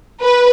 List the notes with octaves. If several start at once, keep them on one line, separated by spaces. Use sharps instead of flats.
B4